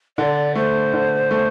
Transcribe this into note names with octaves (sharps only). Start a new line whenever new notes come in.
D3 D5
A3 C5
D3
A3